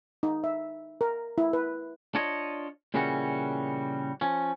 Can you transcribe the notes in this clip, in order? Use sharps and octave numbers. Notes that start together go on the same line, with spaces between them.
D#4
E5
A#4
E4
B4
D4 F4 C#5 D#5
A#2 C#3 E3 G3 C#4 F#4
F3 C#4